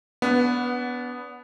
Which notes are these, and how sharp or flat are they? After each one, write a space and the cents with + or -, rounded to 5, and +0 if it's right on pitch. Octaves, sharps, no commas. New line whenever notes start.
B3 +0 D4 -35 F#5 -20